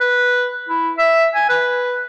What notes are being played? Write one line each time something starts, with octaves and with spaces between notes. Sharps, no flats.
B4
E4
E5
G#5
B4